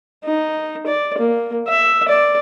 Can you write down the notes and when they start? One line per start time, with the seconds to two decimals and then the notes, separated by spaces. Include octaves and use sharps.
0.24 D#4
0.86 D5
1.18 A#3
1.68 E5
2.08 D5